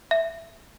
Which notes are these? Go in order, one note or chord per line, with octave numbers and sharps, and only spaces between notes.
E5